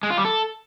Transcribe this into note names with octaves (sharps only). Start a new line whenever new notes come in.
G#3
F4
G3
A4